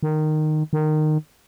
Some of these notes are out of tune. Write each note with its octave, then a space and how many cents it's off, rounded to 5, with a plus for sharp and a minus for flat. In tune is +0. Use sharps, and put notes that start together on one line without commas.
D#3 -15
D#3 -20